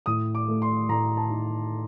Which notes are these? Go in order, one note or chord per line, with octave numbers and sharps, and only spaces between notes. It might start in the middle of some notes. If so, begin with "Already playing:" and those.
A2 D#6
D6
A3
C6
A2 A#5
A5
D#4